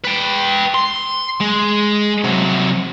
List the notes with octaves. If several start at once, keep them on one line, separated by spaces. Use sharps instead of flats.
B4 G5
C6
G#3
C3 F#3